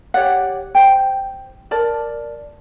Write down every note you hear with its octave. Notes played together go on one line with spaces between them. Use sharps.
G4 C#5 D5 F#5
C5 G5
A#4 D5 A5